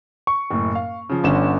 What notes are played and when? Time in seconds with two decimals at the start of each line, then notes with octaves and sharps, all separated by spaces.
0.27 C#6
0.51 F#1 A2
0.75 F5
1.09 C#3 F3
1.24 G1 D3 C#4 E7